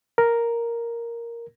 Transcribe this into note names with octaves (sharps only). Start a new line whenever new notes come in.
A#4